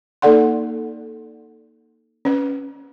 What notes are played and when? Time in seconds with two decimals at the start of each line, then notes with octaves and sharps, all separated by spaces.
0.22 A#3 D#4 A4 D5 F#5 C6
2.25 C#4 B4